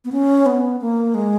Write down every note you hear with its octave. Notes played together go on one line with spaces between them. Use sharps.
B3
C#4
B3
A#3
G#3